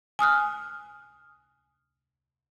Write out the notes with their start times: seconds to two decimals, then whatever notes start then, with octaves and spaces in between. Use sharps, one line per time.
0.19 G#5 D#6 F6 F#6